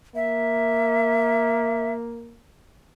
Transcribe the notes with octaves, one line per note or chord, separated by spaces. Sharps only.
A#3 E5